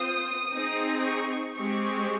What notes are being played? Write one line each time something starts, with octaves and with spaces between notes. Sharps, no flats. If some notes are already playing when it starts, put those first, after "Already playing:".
Already playing: C4 F4 C5 D#6
C4 D#4 G#4
C#6
G#3 C4 G4 C#6